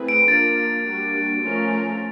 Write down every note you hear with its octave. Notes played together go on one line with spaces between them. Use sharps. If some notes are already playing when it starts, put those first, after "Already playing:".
Already playing: A3 C4 E4 G#4 B4
D7
F3 A#3 D4 F4 A#4 A6
G3 A#3 D4 F#4
F3 A3 C#4 F4 A#4